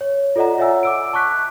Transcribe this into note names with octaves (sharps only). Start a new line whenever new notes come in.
C#5
F4 A4 D5 D#5 F#5 A#5
F4 C#5 E5 F#5 G#5 E6
D6 E6 D7
A5 C#6 D6 F#6 B6
F#6